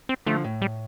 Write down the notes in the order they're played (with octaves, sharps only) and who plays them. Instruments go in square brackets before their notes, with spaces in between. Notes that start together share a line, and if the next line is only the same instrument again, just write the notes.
[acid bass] C4
[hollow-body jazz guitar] D3 F3 [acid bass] A3
[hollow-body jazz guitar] A2
[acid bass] G3